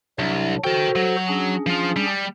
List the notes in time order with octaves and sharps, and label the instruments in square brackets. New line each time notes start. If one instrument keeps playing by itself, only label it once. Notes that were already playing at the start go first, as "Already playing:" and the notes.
[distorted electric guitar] C2 [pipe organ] F#3 D4
[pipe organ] F#4 A4 C5 [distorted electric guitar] A#4 G5
[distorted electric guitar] F#3
[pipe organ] C#4 D4 G#4
[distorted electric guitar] F3 F4
G3